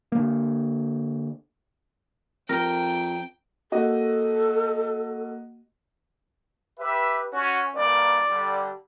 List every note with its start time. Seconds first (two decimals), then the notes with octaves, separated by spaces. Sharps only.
0.12 D3 A#3
2.49 F2 A#4 G5
3.72 A#3 F#4 A4 D#5
6.79 G4 B4 E5
7.33 C#4 F#4
7.75 B1 G2 A#3 D5
8.30 D3 G3